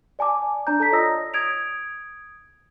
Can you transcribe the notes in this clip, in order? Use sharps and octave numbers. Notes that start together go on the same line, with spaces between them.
D5 G#5 A5 D6
D4 D5 A#5 G6
A4 D5 A5 A#5 B6
F4 C#5 D#5 D#6 E6 A#6
D#6 G#6 D7 F7